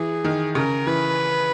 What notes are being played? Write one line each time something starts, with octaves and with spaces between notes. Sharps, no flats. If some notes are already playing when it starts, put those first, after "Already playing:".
Already playing: E3 G#4
D#3
C#3 A#4
E3 B4